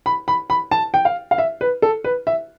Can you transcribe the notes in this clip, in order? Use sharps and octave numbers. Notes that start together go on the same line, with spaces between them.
B5
B5
B5
A5
G5
F5
F5
E5
B4
A4
B4
E5